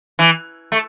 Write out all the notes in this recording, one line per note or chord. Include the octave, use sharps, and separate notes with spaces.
E3
A3